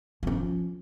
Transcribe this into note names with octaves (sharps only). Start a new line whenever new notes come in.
F3 C#4